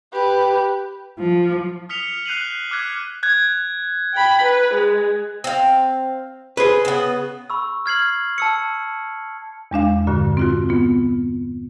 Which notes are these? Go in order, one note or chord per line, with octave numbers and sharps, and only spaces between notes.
G4 B4
F3
D#6 F6 B6 C#7 F7 G7
F#6 G6 C7 D#7 F7 F#7
D6 F6 F#6 G#6 B6
F#6 G#6
G5 B5
B4
G#3
C4 F5
G#4 B4 C5
C#3 B3
B5 C#6 E6
F6 G#6 C7 F#7
A5 E6 C#7
E2 G#3 D4 F5
G2 A#2 D3 F#4
C4 F4 F#4
B3 F4